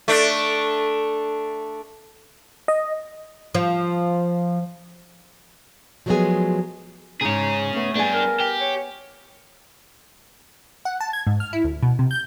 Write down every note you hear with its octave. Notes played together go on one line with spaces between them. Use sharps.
A3 D4
D#5
F3
F3 F#3 G#3 A3 B3 G#4
G#2 C#3 D#4 G#4 C#5
A3 B3 C#4
G2 B3 D4 G#4 G#5
A#4
G4
C#5
F#5
A5
G#6
G#2
F6
E4
D2
B2
C3
G6